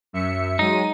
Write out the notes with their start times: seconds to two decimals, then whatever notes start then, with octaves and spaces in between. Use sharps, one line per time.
0.13 F#2 E5 C#7
0.59 F#3 G#3 D#4 D#7